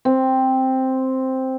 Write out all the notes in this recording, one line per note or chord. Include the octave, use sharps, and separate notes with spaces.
C4